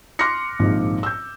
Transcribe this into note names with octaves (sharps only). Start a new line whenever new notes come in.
C6 D6 F6 F#6 A#6 C#7
A#1 G#2 C3 D#3 F3
E6 G6